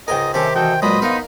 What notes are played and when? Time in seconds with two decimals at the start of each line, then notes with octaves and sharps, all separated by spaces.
0.08 C#2 G#2 A#4 D#5 G5 G#5
0.34 C3 D#3 C4 C#4 G4 A4 E5
0.55 E3 F#4 A4 D#5 G5
0.82 A#2 F#3 G#3 F#4 B4 C5 D#5 B5
1.02 B3 D#4 A#4 D#5 F5